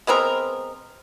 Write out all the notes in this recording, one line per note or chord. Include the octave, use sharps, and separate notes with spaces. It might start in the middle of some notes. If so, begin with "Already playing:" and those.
G#3 B3 C4 A#4